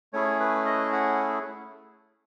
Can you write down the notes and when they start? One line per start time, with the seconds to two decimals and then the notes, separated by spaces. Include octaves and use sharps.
0.13 A3 C#4 E4 G#4 C#5
0.40 B4
0.66 D#5
0.92 F#5